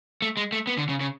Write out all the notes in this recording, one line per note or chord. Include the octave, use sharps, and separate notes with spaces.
A3
G#3
A3
B3
D3
C#3
C#3